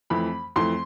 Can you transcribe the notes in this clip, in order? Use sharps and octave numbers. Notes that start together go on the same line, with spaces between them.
F2 E3 A3 B5
F2 E3 A3 C6